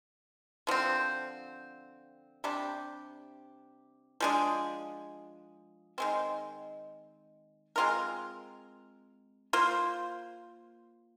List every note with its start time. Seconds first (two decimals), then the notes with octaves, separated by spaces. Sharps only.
0.67 D3 F3 C4
2.44 C3 G3 D4 G4
4.20 F3 G#3 D4 G#4
5.98 D#3 G#3 C4
7.76 G#3 C4 F4 A#4
9.53 A#3 F4 C5